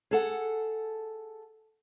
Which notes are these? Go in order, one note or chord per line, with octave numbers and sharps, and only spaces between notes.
G#4 A4 F#5